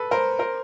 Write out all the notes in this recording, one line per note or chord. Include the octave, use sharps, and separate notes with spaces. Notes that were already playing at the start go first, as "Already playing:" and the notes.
Already playing: A4 B4
A#4 C5
A#4 C5